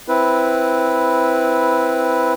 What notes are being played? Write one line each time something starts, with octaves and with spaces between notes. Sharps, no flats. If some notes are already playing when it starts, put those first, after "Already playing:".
C4 E4 B4